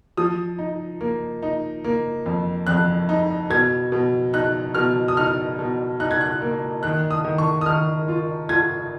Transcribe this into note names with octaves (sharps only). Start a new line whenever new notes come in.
F3 D#6
D#4
A#3
D#4
A#3
F2
F2 F#6
D#4
B2 G#6
B2
D#4 F#6
B2 F6
D#6
D#4 F6
B2
D#4 F#6
G#6
F#6
A#3
D#3 F#6
D#6
D#3
C#6
D#6
D#3 F6
F4
F4 G#6